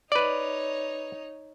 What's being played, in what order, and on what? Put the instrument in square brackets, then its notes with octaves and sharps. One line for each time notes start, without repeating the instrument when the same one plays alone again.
[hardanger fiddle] D#4 C#5 [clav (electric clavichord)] B4 D5